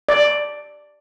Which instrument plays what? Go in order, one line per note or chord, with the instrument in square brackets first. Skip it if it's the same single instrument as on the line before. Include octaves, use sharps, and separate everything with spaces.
[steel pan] D5